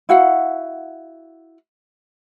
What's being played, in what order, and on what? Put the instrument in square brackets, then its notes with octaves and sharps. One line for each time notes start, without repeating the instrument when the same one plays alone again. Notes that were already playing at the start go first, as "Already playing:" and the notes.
[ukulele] E4 F#4 F5 F#5